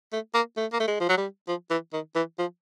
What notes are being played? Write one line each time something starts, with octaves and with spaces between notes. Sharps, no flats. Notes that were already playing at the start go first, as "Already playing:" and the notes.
A3
A#3
A3
A#3
A3
G#3
F3
F#3
G3
F3
E3
D#3
E3
F3